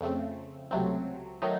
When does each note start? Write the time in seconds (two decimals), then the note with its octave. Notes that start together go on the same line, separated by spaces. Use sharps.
0.01 F2 C#3 A3 C4
0.71 C#2 C3 F#3 A3 C4
1.42 D#3 F#3 A3 D#4